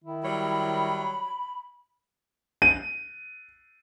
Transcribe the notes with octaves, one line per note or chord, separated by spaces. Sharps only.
D#3 E4
F#3 G3 C#5 B5
D#7